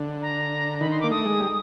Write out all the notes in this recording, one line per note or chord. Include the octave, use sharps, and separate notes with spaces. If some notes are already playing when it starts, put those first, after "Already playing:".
Already playing: D3
A#5
D#3 B5
C6
A#3 D6
A3 D#6
G#3
G3